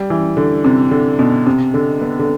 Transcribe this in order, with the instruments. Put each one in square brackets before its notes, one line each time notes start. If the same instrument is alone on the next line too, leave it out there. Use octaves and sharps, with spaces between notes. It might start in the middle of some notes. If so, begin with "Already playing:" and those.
Already playing: [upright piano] G3
E3
D3
C3
D3
B2
C3
D3
B3
D3